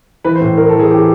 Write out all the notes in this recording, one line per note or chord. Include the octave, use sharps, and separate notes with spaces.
E3 B4
C5
A2
E3 A#4
A4
E3
G#4
E3 G4